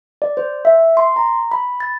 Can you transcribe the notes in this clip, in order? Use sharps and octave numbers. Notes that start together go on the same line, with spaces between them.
D5
C5
E5
C6
A#5
B5
A6